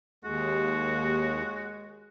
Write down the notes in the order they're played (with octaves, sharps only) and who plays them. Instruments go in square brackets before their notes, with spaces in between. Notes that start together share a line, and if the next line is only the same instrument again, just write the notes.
[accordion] D#2 [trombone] G#3 [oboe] F#4